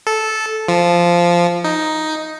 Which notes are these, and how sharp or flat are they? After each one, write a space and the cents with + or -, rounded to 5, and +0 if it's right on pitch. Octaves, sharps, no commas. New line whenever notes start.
A4 -10
F3 -10
D#4 +5